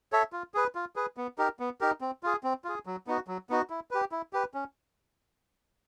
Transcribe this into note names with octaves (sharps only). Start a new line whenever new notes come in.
A4 C#5 E5
F4
G#4 B4
F4
G#4 B4
B3
D#4 G4 A#4
B3
D#4 G4 A#4
C4
F4 G#4
C4
F4 G#4
F#3
B3 D#4 F#4
F#3
B3 D#4 F#4
E4
G4 B4
E4
G4 B4
C#4